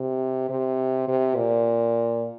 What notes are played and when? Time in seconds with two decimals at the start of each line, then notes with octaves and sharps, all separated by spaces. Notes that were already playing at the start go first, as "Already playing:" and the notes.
Already playing: C3
0.49 C3
1.08 C3
1.36 A#2